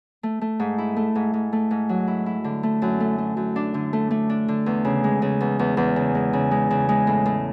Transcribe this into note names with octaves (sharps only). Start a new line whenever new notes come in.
A3
A3
G#2
E4
A3
G#2
G#2
A3
G#2
F#3
E4
E4
D3
A3
F#2
A3
A3
F#2
D4
D3
A3
A3
D4
D3
E2
C#3
G#3
C#3
E2
E2
E2
C#3
G#3
C#3
G#3
C#3
G#3
A2
A2